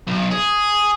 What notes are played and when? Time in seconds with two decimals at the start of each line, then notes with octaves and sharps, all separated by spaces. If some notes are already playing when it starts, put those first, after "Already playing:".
0.07 B1
0.31 G#4